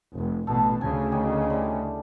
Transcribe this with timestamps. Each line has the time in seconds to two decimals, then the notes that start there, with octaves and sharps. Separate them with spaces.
0.17 F1
0.47 A1 B2 A4 A5
0.81 D2 C#3 G#5
1.12 D#3 G4 G#4
1.50 D3 E3 G3